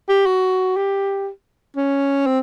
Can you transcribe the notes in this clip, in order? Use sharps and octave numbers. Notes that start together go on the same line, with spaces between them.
G4
F#4
G4
C#4
C4